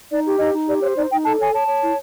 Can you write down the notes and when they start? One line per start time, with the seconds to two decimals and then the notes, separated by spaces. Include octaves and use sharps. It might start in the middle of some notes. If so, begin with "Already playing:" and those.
0.11 D#4 D5
0.25 G4
0.40 D#4 D#5
0.53 D#4
0.67 G4 D5
0.82 C5 C#5
0.96 D#4 D5
1.10 D#4 G5
1.24 A4 A5
1.39 C#5 G#5
1.53 C#5 A5
1.68 C#5
1.82 E4